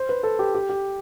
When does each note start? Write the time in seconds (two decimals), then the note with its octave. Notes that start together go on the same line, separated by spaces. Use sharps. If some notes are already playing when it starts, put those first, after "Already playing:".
Already playing: C5
0.09 B4
0.23 A4
0.39 G4
0.55 G4
0.69 G4